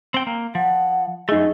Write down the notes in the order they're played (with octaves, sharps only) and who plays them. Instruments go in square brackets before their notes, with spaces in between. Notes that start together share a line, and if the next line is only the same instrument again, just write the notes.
[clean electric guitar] C4 G5
A#3
[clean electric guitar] F3 [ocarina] F#5
[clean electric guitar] F#2 A3 [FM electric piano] D#4 G#4 [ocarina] D#5